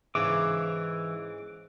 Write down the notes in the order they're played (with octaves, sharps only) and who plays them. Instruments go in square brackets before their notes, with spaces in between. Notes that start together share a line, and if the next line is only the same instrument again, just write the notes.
[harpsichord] G#2 C#3 [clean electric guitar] E3 [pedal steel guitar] D6